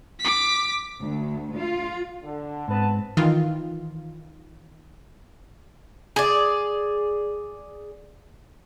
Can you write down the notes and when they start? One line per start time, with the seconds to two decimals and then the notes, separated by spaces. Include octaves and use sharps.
0.20 D6 B6
1.02 D2
1.57 F4
2.23 D3
2.68 G#2 B3 C4 B4 A5
3.17 D#3 E3 F4
6.16 G#4 D5